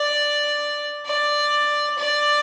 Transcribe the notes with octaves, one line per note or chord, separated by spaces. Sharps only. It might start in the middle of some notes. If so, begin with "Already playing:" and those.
Already playing: D5
D5
D5